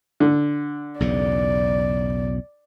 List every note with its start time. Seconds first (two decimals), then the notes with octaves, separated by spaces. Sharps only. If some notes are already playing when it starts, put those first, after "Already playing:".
0.20 D3
1.00 B1 E2 C#3 D5